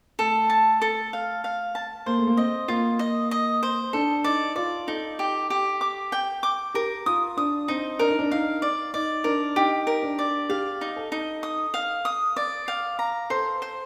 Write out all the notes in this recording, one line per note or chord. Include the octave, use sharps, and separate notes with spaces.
A3 A4
A5
A4
F5
F5
A5
A#3 C5
A3
A#3
C4 D#5
A#3 F4
D#5
D#5
C5
D4 A4
D#4 D5
F4 D5
D#4 A4
G4
G4
D6
G5
D6
G4 A#4
F4 D#6
D4 D#6
C4 D#4
D4 A#4
D#4
D4
D#4 F5
D5
D#4 D5
D4 A#4
D#4 G4
A#4
D4
D5
G4 F5
D#4
A4
D#4
D#6
F5
D#6
D5
F5
A#5
A4 C5
C5